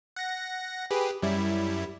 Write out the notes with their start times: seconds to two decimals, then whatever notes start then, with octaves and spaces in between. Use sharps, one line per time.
0.16 F#5 A#6
0.91 G4 G#4 B4
1.22 F#2 G3 E4